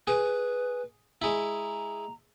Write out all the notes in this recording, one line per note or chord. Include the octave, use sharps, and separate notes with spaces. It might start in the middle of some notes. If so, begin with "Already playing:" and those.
G#4 B4
G#3 E4 A#5